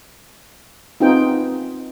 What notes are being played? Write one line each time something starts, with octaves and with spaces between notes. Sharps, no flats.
B3 C4 D#4 F4 G#4 G5